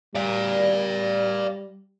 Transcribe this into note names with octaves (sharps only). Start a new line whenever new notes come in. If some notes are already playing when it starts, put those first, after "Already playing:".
G3 D5 F5